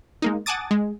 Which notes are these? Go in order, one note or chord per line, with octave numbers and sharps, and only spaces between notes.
G#3 A#3 D#4
F#5 G#5 A5 D6 D#6 A6
G#3